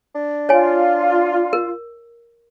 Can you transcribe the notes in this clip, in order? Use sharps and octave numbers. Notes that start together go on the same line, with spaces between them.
D4
F4 C#5 G#5
A#4